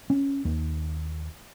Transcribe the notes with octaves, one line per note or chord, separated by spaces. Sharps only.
C#4
D#2